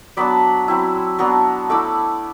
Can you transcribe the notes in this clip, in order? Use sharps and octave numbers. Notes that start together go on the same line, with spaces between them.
F#3 B3 D4 B5 D6
F#3 C4 E4
F#3 B3 D4
A3 E4 B5 D6